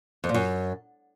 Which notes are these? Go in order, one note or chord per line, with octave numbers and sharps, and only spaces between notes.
F2
A#2
F#2